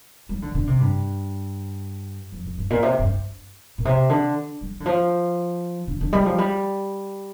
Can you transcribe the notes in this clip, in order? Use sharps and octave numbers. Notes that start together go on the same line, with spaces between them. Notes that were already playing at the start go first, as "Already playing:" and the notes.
G3
D3
D3
C3
G2
F2
F2
G2
A#2
C3
G2
A#2
C3
D3
G3
D3
F3
D3
D3
G3
F3
G3